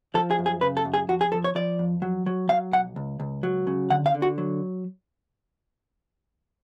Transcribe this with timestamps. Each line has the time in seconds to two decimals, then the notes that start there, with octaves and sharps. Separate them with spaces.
0.14 F3 A4
0.31 G#4
0.39 F#2
0.46 G#4
0.61 C#3 B4
0.77 A4
0.85 F#2
0.94 G#4
1.09 F2 F#4
1.21 G#4
1.32 F3 A4
1.44 C#5
1.55 F3 D5
1.79 F2
2.02 F#3
2.26 F#3
2.49 F#3 F5
2.72 B1 F#5
2.96 C#2
3.20 C#2
3.43 F#3
3.67 C#3
3.90 D3 F#5
4.06 F5
4.14 D3
4.22 F#4
4.38 F#3